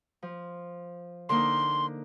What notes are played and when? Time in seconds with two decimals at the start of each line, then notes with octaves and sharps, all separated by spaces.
0.23 F3
1.29 D3 A#3 D#4 C6